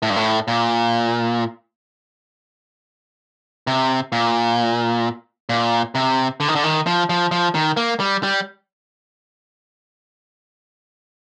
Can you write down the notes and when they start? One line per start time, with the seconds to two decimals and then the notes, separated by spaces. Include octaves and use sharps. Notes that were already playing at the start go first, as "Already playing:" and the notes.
0.02 A2
0.10 G2
0.16 A2
0.48 A#2
3.67 C3
4.12 A#2
5.49 A#2
5.95 C3
6.40 D3
6.48 D#3
6.55 D3
6.64 D#3
6.87 F3
7.09 F3
7.31 F3
7.55 D#3
7.77 A#3
8.00 G3
8.23 G3